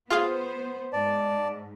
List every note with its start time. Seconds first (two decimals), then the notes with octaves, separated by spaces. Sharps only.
0.10 B3 F4 G#4 C5 F5
0.93 G#2 D5 A5